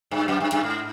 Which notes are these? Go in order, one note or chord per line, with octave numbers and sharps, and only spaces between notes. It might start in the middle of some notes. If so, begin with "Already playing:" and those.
G2
F#2
G2
G2
G#2